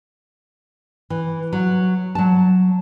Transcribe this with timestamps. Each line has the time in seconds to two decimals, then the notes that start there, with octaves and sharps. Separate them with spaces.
1.10 E3
1.53 F#3
2.15 F#3 A5